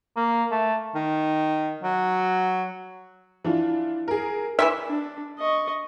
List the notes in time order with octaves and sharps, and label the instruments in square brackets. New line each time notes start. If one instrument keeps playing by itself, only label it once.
[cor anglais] A#3
A3
[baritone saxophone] D#3
F#3
[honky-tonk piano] E3 D4 F4
G#4 A#4
[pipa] E3 G3 E5 [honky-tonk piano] C6
[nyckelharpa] D4
D#5 C#6